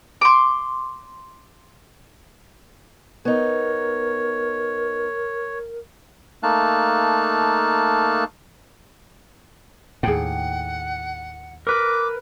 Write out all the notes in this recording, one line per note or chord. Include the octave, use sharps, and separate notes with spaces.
C6 D6
B3 D#4 A#4 C#5
A3 A#3 D#4 F5 A5 F#6
D#2 A2 G#4 F#5 G5
A#4 B4 D6